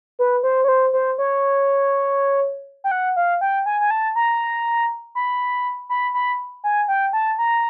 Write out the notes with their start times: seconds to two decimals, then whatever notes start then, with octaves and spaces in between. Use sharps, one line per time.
0.19 B4
0.43 C5
0.64 C#5
0.68 C5
0.93 C5
1.18 C#5
2.84 G5
2.91 F#5
3.16 F5
3.41 G5
3.66 G#5
3.80 G#5
3.91 A5
4.16 A#5
5.15 B5
5.89 B5
6.14 B5
6.64 G#5
6.88 G5
7.13 A5
7.38 A#5